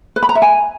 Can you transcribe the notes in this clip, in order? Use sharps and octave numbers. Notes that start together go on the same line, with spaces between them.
B4
B5
A#5
E5
G#5